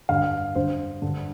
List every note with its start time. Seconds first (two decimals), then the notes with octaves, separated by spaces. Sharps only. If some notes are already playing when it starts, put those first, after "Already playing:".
0.09 G2 D3 F5
0.55 G2 D3 C5
1.02 G2 D3